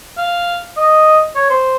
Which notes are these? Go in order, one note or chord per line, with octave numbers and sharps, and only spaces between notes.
F5
D#5
C#5
C5